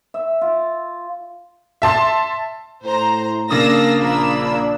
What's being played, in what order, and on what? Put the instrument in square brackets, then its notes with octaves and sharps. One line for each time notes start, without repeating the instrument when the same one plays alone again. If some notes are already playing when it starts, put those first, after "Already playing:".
[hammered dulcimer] E5
F4
[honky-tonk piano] E5 A5 C6
[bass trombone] A2 [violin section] C5 A#5
[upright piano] C#3 D5 D#6 [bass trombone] A#3 [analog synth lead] D4 [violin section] F5 E6 A#6
[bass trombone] A#1 [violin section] A#3 B5 E6